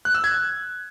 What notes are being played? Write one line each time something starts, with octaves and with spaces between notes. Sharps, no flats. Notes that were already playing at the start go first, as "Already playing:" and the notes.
F#6
E6
G#6